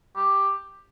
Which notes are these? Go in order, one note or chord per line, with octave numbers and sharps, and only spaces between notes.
G4